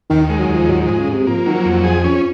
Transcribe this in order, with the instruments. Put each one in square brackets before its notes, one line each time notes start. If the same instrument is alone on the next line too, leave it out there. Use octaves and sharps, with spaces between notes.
[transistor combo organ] D#2 [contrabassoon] D#3
[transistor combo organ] G#3
[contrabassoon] F#3
[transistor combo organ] D#2 [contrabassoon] F3
[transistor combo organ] G#2 [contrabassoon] F#3
[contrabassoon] F3 [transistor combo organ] G#3
[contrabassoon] C#3
[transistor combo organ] G#2 [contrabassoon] C3
[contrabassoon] F3 [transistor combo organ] A#3
[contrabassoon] D#3 [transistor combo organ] F#3
[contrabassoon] F3
[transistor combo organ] F2
G#4
C#4